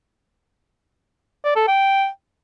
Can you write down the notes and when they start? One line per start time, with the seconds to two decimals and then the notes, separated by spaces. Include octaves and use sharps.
1.44 D5
1.56 A4
1.68 G5